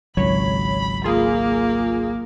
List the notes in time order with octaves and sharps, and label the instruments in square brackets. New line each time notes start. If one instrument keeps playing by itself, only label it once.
[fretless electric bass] G#1 C#2 [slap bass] F#3 [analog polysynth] C#5 [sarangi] B5
[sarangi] A#3 [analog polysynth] F4 G#4